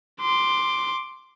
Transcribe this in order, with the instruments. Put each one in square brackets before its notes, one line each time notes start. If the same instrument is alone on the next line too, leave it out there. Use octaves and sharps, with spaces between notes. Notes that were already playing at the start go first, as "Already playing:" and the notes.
[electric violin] C6 D6